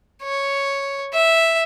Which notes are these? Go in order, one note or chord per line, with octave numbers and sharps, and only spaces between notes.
C#5
E5